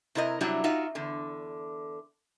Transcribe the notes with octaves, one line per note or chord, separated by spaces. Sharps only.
C3 E4 A#4 D#5
C3 F#3 G3 D4 E4 F#4
D#4 F4 F#4 E5
E2 D3